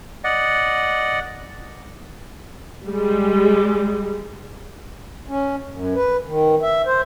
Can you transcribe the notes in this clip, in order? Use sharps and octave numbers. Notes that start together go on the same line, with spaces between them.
D5 D#5 F#5
G3 G#3
C#4
F#2
B4
D#3
E5
C5